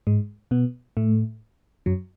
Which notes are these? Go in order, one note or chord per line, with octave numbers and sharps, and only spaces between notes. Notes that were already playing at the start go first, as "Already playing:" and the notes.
G#2 G#3
B2 B3
A2 A3
F#2 F#3